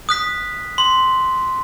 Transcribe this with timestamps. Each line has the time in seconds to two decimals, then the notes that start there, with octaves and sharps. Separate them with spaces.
0.09 D#6 F#6 B6
0.78 C6